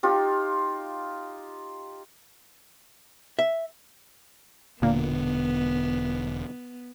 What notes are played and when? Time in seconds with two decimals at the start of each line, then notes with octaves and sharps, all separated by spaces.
0.03 D#4 F4 G4
3.39 E5
4.82 E1 A#2 D3 A#3 B3